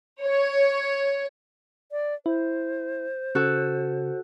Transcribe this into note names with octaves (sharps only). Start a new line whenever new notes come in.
C#5
D5
E4 C5
C#3 F#4 A4